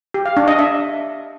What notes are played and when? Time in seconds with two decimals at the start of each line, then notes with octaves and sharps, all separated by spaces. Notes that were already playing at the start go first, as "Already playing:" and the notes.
0.14 G4
0.25 F5
0.37 D4
0.48 D#5
0.59 E5